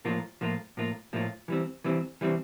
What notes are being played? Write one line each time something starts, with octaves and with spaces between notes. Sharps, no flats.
A2 F3 A#3 F4
A2 F3 A#3 F4
A2 F3 A#3 F4
A2 F3 A#3 F4
E3 G3 C4
E3 G3 C4
E3 G3 C4